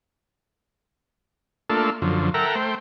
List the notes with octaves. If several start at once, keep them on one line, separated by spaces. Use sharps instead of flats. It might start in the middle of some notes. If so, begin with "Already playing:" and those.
A3 A#3 D4 F4 A4
F#2 D3 F3
A4 A#4 E5 F#5 G5 A#5
A3 C5 G5